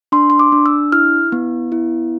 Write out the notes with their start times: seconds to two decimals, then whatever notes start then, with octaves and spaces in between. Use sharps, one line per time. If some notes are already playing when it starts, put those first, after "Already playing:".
0.12 D4 C6
0.30 C6
0.39 D6
0.52 D4
0.66 E6
0.92 E4 F6
1.32 B3
1.72 E4